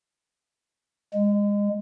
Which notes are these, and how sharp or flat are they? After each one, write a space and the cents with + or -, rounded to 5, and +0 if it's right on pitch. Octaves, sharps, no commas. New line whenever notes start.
G#3 -25